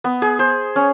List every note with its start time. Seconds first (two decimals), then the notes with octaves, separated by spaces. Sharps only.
0.04 B3
0.22 G#4
0.39 C5
0.76 C#4